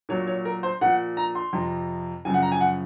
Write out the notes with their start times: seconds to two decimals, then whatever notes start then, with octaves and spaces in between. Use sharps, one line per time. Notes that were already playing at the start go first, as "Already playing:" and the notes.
0.09 A#2 F#3 C#5
0.27 C#5
0.45 A#4
0.63 C5
0.81 A#2 F3 F#5
1.17 A#5
1.35 C6
1.53 F2 C3 F3
2.25 F#2 C#3 F3 G#5
2.34 F#5
2.42 A#5
2.52 G#5
2.61 F#5